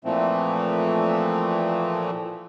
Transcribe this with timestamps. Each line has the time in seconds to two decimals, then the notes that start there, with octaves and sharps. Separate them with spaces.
0.04 A#2 E3 F3 A3 C4